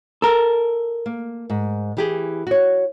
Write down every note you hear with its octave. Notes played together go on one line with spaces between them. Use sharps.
A4 A#4
A#3
G#2
E3 G4 G#4
F#4 C#5